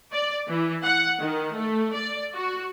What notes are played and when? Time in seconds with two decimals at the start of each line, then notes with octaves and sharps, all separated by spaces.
0.12 D5
0.46 E3
0.84 F#5
1.20 D#3
1.55 A3
1.93 D5
2.34 F#4